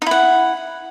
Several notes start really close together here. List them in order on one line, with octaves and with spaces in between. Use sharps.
D#4 E4 F#5